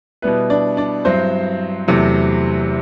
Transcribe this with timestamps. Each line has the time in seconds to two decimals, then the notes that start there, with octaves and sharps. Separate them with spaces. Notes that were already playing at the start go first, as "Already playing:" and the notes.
0.22 B2 G3 B3 E4 B4
0.50 D4 D5
0.77 D4 D5
1.05 G2 F#3 C4 E4 C5
1.88 E2 C3 F#3 A3